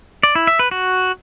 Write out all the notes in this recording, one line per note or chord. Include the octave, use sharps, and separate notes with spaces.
D5
E4
E5
B4
F#4